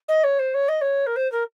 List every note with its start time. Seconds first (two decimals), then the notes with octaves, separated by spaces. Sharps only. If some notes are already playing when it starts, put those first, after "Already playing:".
0.08 D#5
0.24 C#5
0.39 C5
0.54 C#5
0.68 D#5
0.81 C#5
1.07 A#4
1.16 C5
1.32 A#4